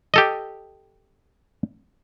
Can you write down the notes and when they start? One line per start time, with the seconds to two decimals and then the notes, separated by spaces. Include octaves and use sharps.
0.14 G4 A4 D#5